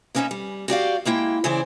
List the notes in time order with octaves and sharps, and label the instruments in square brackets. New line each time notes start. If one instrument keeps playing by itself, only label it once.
[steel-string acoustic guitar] A#3 B3 C#4 D#4 B4 E5
G3
F#4 G4 D5 F5
G#3 A#3 E4 G5
C#3 E3 E4 C5 D5